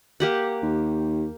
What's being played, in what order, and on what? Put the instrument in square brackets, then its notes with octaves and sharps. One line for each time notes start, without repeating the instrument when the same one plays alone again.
[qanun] A#3 G4 F#5
[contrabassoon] D#2